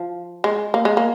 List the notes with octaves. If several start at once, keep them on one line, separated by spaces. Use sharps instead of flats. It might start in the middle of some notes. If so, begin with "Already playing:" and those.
Already playing: F3
G#3
A#3
G#3
A#3